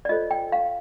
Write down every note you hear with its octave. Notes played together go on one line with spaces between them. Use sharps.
D5
F4 A4 C5 D#5
G5
F5